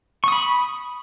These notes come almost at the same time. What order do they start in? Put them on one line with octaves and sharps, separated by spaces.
C#6 D#6 B5